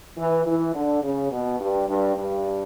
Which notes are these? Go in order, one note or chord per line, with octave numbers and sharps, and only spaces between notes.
E3
E3
D3
C#3
B2
G2
G2
G2